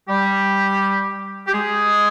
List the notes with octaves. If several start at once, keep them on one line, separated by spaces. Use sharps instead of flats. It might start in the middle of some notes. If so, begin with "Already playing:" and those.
G3 G4
G4
G#3 G#4